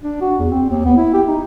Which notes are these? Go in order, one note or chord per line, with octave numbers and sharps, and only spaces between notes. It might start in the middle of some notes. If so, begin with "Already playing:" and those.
D4
F#4
E2
C4
D#2
B3
E4
G4
D#4